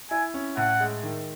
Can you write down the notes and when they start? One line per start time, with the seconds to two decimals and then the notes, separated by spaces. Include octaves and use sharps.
0.11 E4 G#5
0.34 C#4
0.57 A2 F#5
0.80 G#3
1.03 D#3